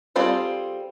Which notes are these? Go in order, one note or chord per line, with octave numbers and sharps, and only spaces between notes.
G3 C4 F4 G#4 A4